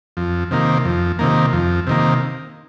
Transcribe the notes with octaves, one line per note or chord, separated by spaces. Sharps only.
F2
C3 D#3 A#3
F2
C3 D#3 A#3
F2
C3 D#3 A#3